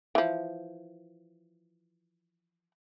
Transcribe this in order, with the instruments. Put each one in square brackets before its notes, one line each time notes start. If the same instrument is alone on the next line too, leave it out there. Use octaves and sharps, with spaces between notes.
[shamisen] E3 F3